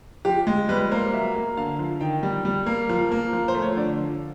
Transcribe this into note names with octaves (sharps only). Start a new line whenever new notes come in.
F3 G4
G#3
G3 B4
A#3 C5
F#3 E5
A#3
D3 F5
F3
D#3 G5
G3
G3
A#3
F3
A#3
F3
C5
A3
C#5
D3 D5
F3